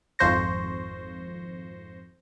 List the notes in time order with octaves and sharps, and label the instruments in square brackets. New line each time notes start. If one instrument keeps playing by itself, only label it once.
[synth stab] G#1 F2 F3 C5 C#6 A#6